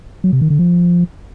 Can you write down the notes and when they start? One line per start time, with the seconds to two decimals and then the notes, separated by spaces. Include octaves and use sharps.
0.24 F#3
0.33 C3
0.41 D#3
0.50 D3
0.59 F3